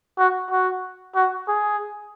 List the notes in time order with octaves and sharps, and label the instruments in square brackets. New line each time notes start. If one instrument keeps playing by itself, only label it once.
[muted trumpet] F#4
F#4
F#4
G#4